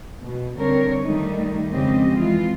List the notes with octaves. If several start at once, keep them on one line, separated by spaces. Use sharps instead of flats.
B2
D3 G3 C4 A#4 C#5
D#3 G3 A3 D#4
F2 C#3 G#3 C4 G4 D#5
E3 G#3 C4 F4